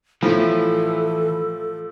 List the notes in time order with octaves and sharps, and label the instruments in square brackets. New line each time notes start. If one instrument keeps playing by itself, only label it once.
[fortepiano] A2 F3 [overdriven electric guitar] E3 [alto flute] A4